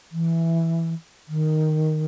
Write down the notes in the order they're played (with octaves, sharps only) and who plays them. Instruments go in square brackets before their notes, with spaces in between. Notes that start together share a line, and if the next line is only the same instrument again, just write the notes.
[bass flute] E3
D#3